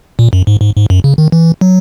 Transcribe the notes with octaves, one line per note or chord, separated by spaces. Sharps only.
A#2
F#2
G#2
G#2
G#2
F#2
C#3
D#3
E3
F#3